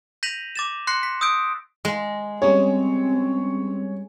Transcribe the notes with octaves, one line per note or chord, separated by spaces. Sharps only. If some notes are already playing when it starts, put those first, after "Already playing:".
G6 A#6 B6 D#7 F7 F#7
D6 A6 E7
C6 F#6 A#6 C7 C#7
B6
D#6 E6 G6 D7
G#3
G3 C4 C#4 G#4 C#5